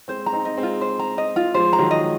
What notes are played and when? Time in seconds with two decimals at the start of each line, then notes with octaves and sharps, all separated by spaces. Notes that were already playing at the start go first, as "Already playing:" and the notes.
0.08 G#3 C4 C5
0.26 A#5
0.33 C4 D#4
0.45 D#5
0.58 G#3 C4
0.63 F4
0.81 C5
0.99 A#5
1.18 D#5
1.36 F4
1.54 F3 G#3 C5
1.73 A#5
1.79 D#3 F#3
1.91 D#5
2.03 G#3